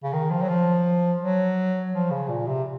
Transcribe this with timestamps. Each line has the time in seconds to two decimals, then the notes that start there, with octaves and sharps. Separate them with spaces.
0.04 C#3
0.13 D#3
0.30 F3
0.42 F#3
0.49 F3
1.21 F#3
1.93 F3
2.11 C#3
2.29 A#2
2.46 C3